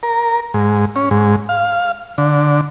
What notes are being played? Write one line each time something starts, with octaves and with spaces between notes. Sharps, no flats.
A#4
G#2
C#4
G#2
F5
D3